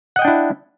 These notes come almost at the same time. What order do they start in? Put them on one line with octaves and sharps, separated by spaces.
F#5 D#5 G5 D4 E4